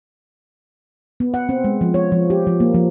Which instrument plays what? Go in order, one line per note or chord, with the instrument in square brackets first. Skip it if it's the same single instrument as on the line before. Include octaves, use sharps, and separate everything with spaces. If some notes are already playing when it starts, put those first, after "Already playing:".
[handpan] B3
F#5
C4
G#3
F3
C#5
F3
G4
F3
A#3
F3